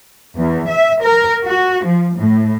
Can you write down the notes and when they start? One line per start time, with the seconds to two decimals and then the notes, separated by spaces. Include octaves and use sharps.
0.37 E2
0.68 E5
1.02 A#4
1.44 F#4
1.85 F3
2.16 A2